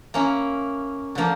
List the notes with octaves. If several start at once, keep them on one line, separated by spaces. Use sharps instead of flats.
A#3 C#4 E4
D3 F3 A#3